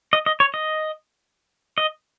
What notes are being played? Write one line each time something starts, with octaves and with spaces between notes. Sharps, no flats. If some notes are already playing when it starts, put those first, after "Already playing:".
D#5
D#5
C#5
D#5
D#5